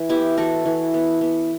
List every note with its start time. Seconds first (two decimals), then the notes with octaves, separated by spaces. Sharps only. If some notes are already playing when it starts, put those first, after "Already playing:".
Already playing: E3
0.09 B3 E4 G4
0.37 E3 F#4 A4
0.65 E3
0.94 B3
1.21 B3